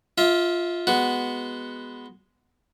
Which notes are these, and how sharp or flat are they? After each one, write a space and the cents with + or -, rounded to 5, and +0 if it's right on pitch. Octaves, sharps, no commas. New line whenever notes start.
F4 +0 E5 -35
G#3 +0 B3 +0 F#4 +0